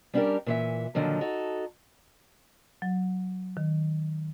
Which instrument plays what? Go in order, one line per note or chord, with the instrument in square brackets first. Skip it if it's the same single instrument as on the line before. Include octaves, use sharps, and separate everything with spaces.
[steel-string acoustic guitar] G3 C#4 D4 F#4 G4 A#4
A#2 E3 E5
A#2 D3 D#3 F3 F#3
D#4 F#4 A4
[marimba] F#3
D#3